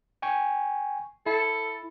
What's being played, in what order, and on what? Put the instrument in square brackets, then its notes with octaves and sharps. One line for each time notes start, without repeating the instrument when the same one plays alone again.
[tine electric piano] G5 G#5 C#6
[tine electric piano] E4 [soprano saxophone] A4